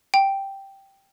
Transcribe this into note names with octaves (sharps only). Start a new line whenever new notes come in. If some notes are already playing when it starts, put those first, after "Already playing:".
G5